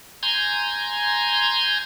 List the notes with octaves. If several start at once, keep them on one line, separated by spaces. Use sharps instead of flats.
G#5 A#5 C6 G6 G#6